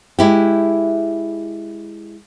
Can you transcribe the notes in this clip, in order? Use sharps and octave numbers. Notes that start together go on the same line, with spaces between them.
G#3 E4 G4